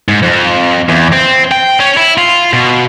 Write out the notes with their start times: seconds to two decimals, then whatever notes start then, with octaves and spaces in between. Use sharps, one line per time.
0.08 G#2
0.23 F2
0.89 E2
1.12 C4
1.51 G5
1.80 C#4
1.97 E4
2.18 F4
2.53 B2